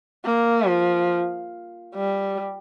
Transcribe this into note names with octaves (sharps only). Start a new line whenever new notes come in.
A#3
F3
G3